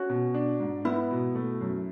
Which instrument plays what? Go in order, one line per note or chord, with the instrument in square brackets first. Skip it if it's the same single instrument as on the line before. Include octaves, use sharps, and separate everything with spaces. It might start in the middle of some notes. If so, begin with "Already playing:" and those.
Already playing: [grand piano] C#4 [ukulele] F#4
[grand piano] B2
D4
G#2
[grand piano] B3 [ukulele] E4
[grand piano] B2
A3
F#2